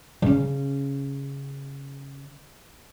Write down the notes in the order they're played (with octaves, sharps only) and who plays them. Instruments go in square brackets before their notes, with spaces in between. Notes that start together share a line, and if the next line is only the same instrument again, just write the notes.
[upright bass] C#3 C#4